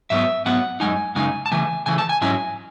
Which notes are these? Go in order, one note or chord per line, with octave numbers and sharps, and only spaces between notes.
G#2 F#3 B3 E5
G#2 F#3 B3 F#5
F#2 C#3 G#3 D#4 G#5
F#2 C#3 G#3 D#4 G#5
A5
C#3 E3 A3 G#5
C#3 E3 A3 G#5
A5
G#5
G#2 F#3 C#4 E4 G#5